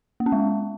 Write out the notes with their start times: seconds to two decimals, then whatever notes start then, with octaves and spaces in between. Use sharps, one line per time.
0.20 A#3
0.26 C#4
0.32 G#3